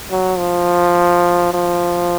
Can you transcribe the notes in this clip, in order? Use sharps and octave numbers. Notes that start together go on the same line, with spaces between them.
F#3
F3
F3